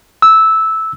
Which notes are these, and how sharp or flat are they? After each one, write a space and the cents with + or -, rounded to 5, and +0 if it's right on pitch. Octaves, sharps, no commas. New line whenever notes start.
E6 -10